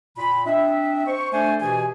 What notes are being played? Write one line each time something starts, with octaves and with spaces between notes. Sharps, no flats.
A#2 B5
C4 D4 D#5 E5
C5 C#6
A3 D4 A4 C5 D5 G#5
B2 E3 G4 G#4 G#5